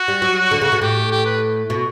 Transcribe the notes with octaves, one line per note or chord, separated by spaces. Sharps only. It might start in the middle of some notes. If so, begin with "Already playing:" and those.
Already playing: F#4
G3
F#3
D3
C#3
B2
A2 G4
G4
B4
B2